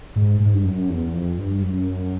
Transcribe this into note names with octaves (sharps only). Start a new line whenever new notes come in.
G#2
G#2
G2
F#2
E2
F2
G2
F#2